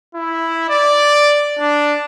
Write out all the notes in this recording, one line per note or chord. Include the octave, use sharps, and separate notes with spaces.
E4
D5
D4